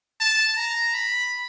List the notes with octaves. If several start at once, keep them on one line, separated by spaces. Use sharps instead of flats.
A5
A#5
B5